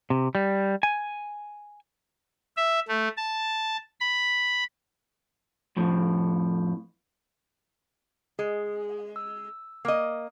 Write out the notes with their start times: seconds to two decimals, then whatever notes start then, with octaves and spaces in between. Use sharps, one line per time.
0.10 C3
0.35 G3
0.83 G#5
2.57 E5
2.88 A3
3.17 A5
4.00 B5
5.77 F2 A2 F3
8.39 G#3 G#4
9.16 E6
9.85 A#3 D#5